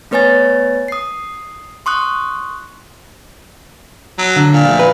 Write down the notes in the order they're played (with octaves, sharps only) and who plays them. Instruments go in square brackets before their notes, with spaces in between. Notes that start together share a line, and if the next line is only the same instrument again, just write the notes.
[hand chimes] A3 B3 B4 C#5 G#5 A6
D#6 C7
C6 C#6 D#6 F#6
[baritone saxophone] F#3
[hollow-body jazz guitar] D3
[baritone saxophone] A#2
[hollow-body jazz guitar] F3 A3
B4